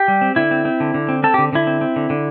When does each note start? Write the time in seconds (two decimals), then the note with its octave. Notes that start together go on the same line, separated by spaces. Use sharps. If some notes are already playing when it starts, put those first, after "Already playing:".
Already playing: G4
0.08 G3
0.21 C4
0.36 D3 E4
0.51 C4
0.65 C4
0.80 D3
0.94 D3
1.09 C4
1.23 C4 A4
1.34 D3 G4
1.53 D3 E4
1.67 C4
1.81 C4
1.96 D3
2.10 D3